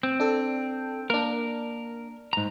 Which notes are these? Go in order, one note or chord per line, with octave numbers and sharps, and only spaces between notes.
C4
D4 A4
A#3 D4 A#4
G#2 A#5